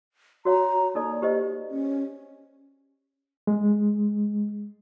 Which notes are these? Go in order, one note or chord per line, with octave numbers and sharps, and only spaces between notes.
F#4 C#5 F5 A#5
A#3 D#4 A4 D5
G4 C5 D#5
C#4
G#3